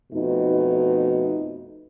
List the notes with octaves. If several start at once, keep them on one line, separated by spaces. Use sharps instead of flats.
F2 B2 A3 D#4